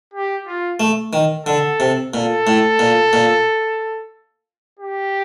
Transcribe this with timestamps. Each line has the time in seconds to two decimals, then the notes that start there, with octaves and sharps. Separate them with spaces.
0.14 G4
0.47 F4
0.80 A3
1.13 D#3
1.46 D3 A4
1.80 C3
2.13 A#2 A4
2.47 A2
2.79 A#2
3.13 A#2
4.79 G4